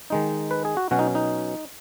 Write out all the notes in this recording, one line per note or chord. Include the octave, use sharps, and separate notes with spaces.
D#3 G#3 D#4
B4
G#4
F#4
B2 F#3 C#4 F#4
D#4
D#4